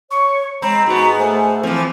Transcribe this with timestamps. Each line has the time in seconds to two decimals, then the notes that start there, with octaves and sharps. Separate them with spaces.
0.11 C#5 C#6
0.62 G#3 C4 A#5 B5
0.87 G#2 B3 F#4
1.19 A3 C5 G#5
1.63 E3 F3 C4